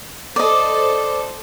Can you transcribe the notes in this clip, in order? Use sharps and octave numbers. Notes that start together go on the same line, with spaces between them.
A4 C5 D5 D#5